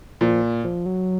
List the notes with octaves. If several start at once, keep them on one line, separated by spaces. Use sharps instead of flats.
A#2 F3
F3
F#3